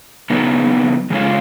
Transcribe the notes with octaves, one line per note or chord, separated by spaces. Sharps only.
C#3 F#3 B3 D#4
F#2 C#3 G#3 C#4 F4